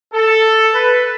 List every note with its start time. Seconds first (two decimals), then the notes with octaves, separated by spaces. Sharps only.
0.14 A4
0.74 B4